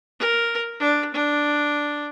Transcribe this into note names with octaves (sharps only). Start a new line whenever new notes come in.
A#4
D4
D4